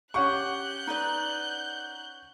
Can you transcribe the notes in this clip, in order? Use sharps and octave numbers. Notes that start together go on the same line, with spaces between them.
C#4 G4 F#5 C#6 F#6 G6
D#4 B4 D5